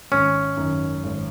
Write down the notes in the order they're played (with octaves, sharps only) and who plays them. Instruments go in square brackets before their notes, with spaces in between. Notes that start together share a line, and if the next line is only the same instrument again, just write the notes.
[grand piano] G#1 [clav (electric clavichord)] C#4
[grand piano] F#2 D#3
G#1